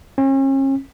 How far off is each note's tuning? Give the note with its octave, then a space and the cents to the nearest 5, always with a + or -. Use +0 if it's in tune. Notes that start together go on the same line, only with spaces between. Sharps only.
C#4 -40